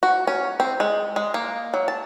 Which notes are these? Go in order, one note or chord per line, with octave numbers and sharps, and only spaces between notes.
F#4
C#4
C4
G#3
G#3
A#3
F#3
A5